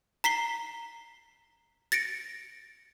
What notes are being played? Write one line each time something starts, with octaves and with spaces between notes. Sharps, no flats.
A#5 B6 C7 G7
A6 A#6 C#7 D7